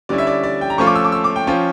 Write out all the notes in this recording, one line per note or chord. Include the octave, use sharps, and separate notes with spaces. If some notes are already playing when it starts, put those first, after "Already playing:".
D3 G3 C#4 E4 D5
E5
D5
D5
G5
A#5
F3 A3 C#4 F4 C#6
D6
E6
D6
E6
D6
G5
F3 C#4 F4